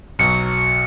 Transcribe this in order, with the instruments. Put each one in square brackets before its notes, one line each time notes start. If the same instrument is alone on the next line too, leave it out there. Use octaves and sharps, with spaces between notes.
[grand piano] B1 B2 F#3 [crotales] C#7